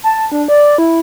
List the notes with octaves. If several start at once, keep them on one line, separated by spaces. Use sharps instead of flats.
A5
D4
D5
E4